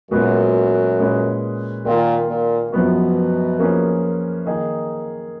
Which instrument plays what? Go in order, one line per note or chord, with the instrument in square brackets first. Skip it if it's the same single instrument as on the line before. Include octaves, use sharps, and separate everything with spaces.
[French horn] F#2 [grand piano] A#2 G#3 B3 F#4 B4
[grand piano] A#2 G#3 C#4 G#4 B4
[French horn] A#2 [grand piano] D#3 A#3 F4 A#4
[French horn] A#2
[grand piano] F#2 F3 B3 F#4 [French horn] B2
[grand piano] F3 A#3 C#4 G#4 B4
D#3 A#3 D#4 G#4 D#5